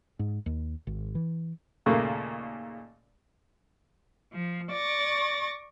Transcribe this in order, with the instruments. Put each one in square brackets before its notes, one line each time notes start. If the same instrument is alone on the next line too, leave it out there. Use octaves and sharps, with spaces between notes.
[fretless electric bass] G#2
D#2
G#1
E3
[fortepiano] D#2 A#2 C#3 A3 A#3
[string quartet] F3
D5 C#6 A6 A#6